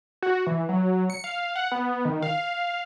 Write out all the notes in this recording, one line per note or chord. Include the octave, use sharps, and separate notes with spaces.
F#4
E3
F#3
C#7
F5
F#5
B3
D#3
F5